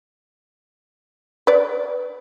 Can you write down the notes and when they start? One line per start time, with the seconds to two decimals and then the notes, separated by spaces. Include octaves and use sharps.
1.47 B4 D5